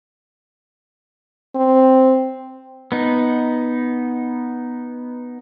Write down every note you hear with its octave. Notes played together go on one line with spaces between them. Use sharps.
C4
B3 D#4